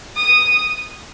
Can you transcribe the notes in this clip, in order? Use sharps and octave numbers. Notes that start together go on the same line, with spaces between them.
D#6